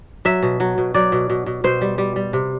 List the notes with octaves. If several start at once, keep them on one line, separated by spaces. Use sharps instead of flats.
F#3 E5
B2
F#3
B2
F#3 D5
B2
B2
B2
B2 C5
G3
G3
G3
C3